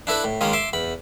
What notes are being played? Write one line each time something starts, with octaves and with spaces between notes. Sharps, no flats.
D4 E4 A4 B4
A2
D#3 G#3 A#3 C#4 F4
E5 C6 D6
E2 B5